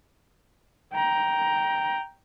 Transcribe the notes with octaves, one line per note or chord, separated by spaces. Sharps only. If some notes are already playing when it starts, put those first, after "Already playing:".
G5 A#5